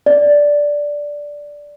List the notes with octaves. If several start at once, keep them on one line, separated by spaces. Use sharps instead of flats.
D5